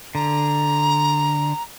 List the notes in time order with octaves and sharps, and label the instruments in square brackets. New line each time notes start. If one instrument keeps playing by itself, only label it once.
[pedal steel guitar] D3 [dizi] A#5